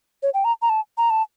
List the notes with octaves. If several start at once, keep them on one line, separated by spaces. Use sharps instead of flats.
C#5
G5
A#5
A#5
A5
A#5
A5